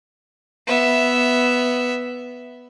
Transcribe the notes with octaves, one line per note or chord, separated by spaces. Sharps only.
B3 E5